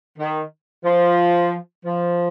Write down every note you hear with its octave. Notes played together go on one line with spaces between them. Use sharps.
D#3
F3
F3